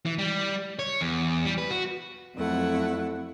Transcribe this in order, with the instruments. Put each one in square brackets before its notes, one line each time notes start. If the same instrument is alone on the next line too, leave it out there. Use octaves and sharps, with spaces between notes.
[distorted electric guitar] E3
G3
C#5
E2
G3
B4
F#4
[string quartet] F2 F#3 A3 E4 F#5